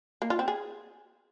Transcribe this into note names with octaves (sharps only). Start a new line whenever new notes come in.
A#3
F4
C4
G#4